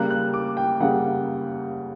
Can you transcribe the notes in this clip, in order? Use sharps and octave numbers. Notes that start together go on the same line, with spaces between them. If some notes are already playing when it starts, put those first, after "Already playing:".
Already playing: C#3 G3 A#3 F#6
F#6
D6
G5
C#3 G3 A#3 F#5